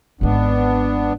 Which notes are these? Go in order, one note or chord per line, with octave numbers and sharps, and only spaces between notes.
G#1 G#3 B3 D4